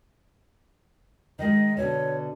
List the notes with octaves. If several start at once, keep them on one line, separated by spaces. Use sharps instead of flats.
D#3 G#3 D#5
B2 D3 C#5